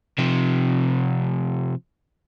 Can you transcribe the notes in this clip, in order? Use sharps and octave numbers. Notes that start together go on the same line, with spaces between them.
C3 F3